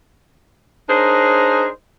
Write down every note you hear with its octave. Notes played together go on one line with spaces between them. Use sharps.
D4 D#4 G#4 A#4 C5 C#5